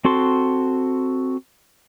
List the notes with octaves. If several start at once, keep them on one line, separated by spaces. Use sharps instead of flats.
C4 F#4 A4 C6